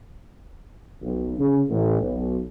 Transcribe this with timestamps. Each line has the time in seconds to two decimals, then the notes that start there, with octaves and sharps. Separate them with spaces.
1.02 B1
1.39 C#3
1.70 A1
2.01 B1